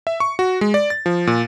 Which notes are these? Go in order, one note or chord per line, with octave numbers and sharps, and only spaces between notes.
E5
C#6
F#4
G#3
D5
A6
F3
A#2